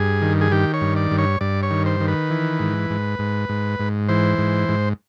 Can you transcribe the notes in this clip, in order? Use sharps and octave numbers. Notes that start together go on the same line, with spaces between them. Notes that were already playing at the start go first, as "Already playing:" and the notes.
Already playing: G2 G#4
D#3
G#4
D#3 G4
C#5
G2
D5
G2
C#5
G2 D5
C#5
D#3
C5
D#3
B4
E3
G#2
G#2
G#2
G#2
G#2
E3 C5
G#2
G#2